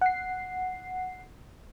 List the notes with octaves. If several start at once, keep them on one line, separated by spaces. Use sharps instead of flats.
F#5 C7